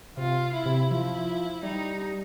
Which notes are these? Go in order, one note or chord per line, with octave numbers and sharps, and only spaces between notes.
C3 F4
E4
C3
F3 E4
G3 D#4